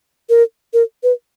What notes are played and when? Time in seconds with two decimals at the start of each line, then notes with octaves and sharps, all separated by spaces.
0.29 A#4
0.73 A#4
1.03 B4